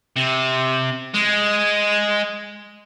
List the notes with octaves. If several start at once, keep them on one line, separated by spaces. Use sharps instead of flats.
C3
G#3